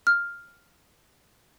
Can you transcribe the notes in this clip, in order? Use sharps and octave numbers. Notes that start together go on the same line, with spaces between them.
F6